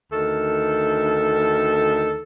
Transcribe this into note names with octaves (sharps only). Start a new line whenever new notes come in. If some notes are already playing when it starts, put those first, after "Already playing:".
D2 D#3 A4